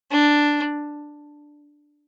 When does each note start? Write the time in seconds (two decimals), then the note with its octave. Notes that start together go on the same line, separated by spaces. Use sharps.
0.11 D4